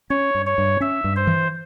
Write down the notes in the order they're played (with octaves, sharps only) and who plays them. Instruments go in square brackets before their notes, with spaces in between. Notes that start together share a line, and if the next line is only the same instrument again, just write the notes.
[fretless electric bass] C#4 [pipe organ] C#5
[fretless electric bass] G2
[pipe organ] C#5
[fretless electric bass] G2
[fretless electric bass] C#4 [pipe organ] E5
[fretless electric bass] G2
[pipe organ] C5
[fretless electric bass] E3